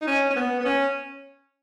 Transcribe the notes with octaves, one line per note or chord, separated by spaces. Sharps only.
D#4
C#4
C#4
B3
B3
C#4